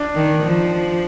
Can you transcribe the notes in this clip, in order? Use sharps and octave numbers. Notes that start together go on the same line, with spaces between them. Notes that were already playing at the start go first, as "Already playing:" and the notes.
Already playing: D4
D#3
F3